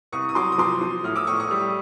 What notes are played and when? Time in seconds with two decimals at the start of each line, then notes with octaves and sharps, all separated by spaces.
0.12 C2 C#6 D#6
0.29 D#6
0.35 F#3 C6 D6
0.52 D#6
0.58 F3 C6 D6
0.81 F3
1.04 A2 D#6 F6
1.16 D6 E6
1.27 A2 C#6 D#6
1.40 C#6 D#6
1.51 G3